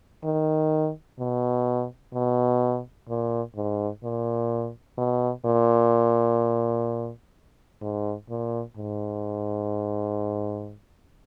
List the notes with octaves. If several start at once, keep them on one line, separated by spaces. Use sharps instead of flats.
D#3
B2
B2
A#2
G#2
A#2
B2
A#2
G#2
A#2
G#2